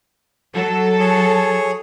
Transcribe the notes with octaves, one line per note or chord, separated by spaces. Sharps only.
F#3 A4
G#4 C#5